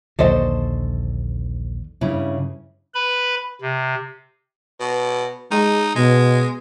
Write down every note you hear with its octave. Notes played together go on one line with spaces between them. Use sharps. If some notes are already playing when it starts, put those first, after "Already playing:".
A#1 D#2 D3 A4 C5 D5 D#5
G2 C#3 E4
B4 B5
C3
B2
G#3 D#4
B2 G#3